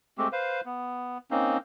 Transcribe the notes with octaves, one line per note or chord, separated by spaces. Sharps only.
G#3 A3 C4 G4
B4 C5 F5
B3
A#3 C4 C#4 D#4